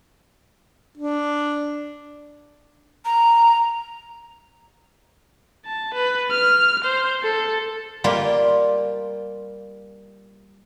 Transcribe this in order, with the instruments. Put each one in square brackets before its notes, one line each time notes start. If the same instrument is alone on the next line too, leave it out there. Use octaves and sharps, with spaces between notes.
[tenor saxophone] D4
[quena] A#5
[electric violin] A5
B4
F6
C5
A4
[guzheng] G3 A#3 F4